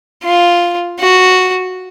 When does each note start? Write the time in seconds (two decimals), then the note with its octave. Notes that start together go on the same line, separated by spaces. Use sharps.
0.23 F4
1.00 F#4